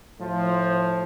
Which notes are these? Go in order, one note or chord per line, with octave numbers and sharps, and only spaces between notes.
A2 F3